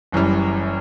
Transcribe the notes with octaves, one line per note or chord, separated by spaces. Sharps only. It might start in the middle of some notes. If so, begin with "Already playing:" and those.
F#1 F#2 E3 G3